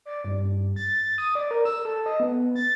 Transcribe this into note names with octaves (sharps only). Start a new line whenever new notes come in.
D5
G2
A6
D#6
D5
A#4
E6
A4
D#5
B3
A6